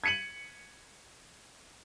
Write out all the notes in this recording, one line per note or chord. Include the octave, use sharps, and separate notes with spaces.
G#6 B6 C#7 D#7 F#7